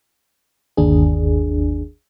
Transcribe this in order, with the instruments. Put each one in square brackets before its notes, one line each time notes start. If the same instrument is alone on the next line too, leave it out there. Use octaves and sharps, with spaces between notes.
[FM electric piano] G1 D#2 D4 G#4